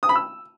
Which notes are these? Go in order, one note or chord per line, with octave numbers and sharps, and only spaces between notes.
D#6
B5
E6